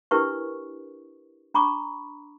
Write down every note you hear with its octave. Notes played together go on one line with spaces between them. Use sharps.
D4 E4 G4 A#4 B4 C#6
D4 A#5 B5 C#6 D6